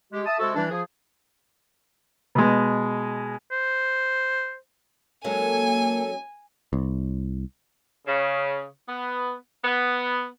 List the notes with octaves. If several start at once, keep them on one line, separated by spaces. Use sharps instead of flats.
G#3 G4
E5 A5 D#6
C3 G#3 F#4 A4
E3 G3 D4
F3 G#4
B2 G#3
C5
F#3 G#3 A#3 C#4 A4 G#5
C2
C#3
B3
B3